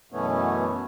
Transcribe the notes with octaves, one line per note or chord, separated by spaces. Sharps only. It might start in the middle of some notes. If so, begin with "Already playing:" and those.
F#2 B2 E3 A3 B3 C#4